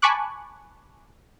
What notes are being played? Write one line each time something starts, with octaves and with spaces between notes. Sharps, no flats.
G#5 A5 B5 C#6 D6 F#6